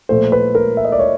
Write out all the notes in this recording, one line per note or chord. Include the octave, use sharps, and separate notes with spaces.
A#2 F3 A3 C5
B4
A#4
E5
D#5
D5
C#5